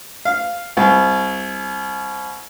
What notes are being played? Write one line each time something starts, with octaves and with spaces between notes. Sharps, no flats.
F5
C2